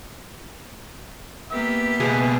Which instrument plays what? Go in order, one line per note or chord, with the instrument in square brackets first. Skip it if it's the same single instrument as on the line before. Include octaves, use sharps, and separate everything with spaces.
[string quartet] A#3 B3 G4 [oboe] E5
[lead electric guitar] C#2 B2 [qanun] G#4